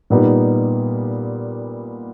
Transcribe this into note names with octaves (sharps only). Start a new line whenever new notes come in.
A#2 G3 B3 D#4